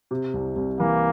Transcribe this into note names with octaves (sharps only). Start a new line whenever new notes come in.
C3
C2
C2
E3 A#3